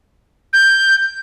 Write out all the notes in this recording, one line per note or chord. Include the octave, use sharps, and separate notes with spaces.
G6